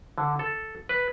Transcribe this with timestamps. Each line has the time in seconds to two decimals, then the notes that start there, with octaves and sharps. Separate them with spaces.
0.18 D3
0.39 A4
0.89 B4